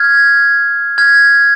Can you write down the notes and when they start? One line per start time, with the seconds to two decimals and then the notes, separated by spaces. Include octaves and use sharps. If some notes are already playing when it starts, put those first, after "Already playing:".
Already playing: F6 G#6
0.98 F6 G#6